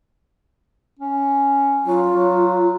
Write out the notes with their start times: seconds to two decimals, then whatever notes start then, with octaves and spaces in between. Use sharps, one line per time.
0.99 C#4
1.86 F#3 F4
2.11 F#3